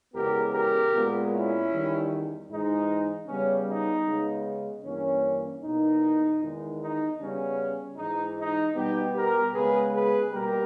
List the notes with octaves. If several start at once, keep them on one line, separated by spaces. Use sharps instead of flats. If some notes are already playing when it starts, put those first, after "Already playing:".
E2 C#3 G#3 B3 G4 A#4
G4 A#4
A#2 G#3 B3
C#4 E4
E2 D#3 G3
G#2 E3 G#3 D#4
C#3 G3 B3 C#4
D#4
C#3 G#3 B3
G2 E3 A#3 C#4
E2 B2 A#3 D#4
E2 D#3 G#3
D#4
C#3 G3 B3 C#4
G#2 E3 G#3 D#4
D#4
B2 G3 B3 D#4 G4
G4 A#4
C#3 G#3 B3 G#4 B4
G#4 B4
B2 G3 A#3 G4 A#4